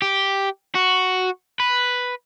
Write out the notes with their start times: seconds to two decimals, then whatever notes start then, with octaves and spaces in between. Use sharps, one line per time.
0.02 G4
0.75 F#4
1.60 B4